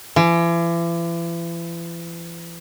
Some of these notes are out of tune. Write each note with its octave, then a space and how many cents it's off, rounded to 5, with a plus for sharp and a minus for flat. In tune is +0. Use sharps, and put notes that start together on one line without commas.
E3 +40